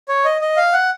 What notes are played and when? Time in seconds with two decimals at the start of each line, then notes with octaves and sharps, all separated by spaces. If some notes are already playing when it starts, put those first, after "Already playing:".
0.08 C#5
0.25 D#5
0.41 D#5
0.57 F5
0.73 F#5